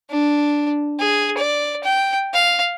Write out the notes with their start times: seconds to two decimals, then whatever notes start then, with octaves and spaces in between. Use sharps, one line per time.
0.10 D4
0.99 G#4
1.38 D5
1.84 G5
2.34 F5